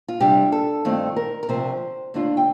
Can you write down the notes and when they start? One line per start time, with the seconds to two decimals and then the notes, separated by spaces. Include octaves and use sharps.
0.08 F4
0.20 C3 G3 D4 F4 G4
0.52 A4
0.85 G2 D#3 A3 C4 F4
1.16 A#4
1.43 A#4
1.49 D2 C3 F3 C5
2.14 D#2 D3 A3 D4 F4
2.37 G5